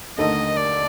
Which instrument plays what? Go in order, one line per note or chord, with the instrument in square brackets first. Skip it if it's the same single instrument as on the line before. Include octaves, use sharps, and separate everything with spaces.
[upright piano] D#2 D3 A3 D#4 [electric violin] D#5
[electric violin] D5